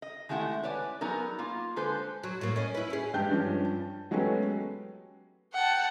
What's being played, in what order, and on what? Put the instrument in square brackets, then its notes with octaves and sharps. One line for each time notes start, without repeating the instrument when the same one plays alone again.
[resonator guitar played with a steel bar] D#5
D#3 G#3 A3 E4 G4 F#5
B4 C#5 D5 F#5 G#5
F#3 B3 D#4 G#4 A#4
A#3 F4
D3 G#3 A4 B4 C5
[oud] F#3
A2 A#3
C#4 D#5
E4 B4
C#4 G#4
[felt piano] G2 G#3 G4 G5 A5 G6
G2 F3 C#4
A5
F#3 G#3 A3 B3 C#4 G4
[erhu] F#5 [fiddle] G5 A5